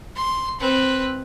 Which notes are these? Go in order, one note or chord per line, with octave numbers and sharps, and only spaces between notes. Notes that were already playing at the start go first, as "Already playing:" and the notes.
C6
C4 B4